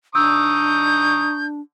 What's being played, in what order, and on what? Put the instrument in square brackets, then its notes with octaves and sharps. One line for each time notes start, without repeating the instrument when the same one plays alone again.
[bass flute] D4 [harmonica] A#5 C#6 D#6 [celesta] E6 [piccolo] G6